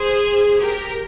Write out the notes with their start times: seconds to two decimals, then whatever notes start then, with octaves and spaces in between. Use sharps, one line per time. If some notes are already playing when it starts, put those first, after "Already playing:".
Already playing: G#4 C5
0.60 G4 A#4